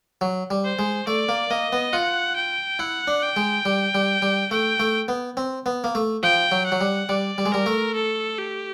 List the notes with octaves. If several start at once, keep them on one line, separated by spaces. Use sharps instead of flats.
F#3
G3
C5
G#3
A3 D5
A#3
A#3 D#5
B3
F4 F#5
G5
E4 F#5
D4
G5
G#3
G3
G3
G3
A3 G5
A3
B3
C4
B3
A#3
A3
F3 G5
F#3
F#5
F#3
G3
G3 D5
G3
G#3
G3 A#4
A3
A4
G4